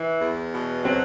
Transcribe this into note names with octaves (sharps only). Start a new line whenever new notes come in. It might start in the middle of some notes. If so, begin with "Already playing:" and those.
Already playing: E3
E2
B2
F#3 C4